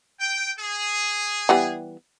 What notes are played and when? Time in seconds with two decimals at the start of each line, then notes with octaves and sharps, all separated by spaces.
0.19 G5
0.58 G#4
1.49 E3 G3 B3